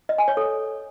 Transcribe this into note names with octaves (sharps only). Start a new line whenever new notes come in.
D#5
G#5
C#5
A4